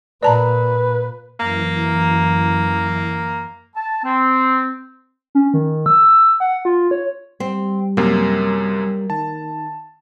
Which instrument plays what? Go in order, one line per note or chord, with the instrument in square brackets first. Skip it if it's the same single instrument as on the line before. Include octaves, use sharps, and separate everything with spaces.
[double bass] A#2 [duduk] B4 [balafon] D5 A5 A#5
[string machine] F#2 E3 [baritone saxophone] A#3
[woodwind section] A5
C4
[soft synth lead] C#4
D#3
E6
F#5
F4
C#5
[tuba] G3 [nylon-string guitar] C4
[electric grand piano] F#2 C3 [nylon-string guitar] A#3
[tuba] D#3 [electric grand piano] A5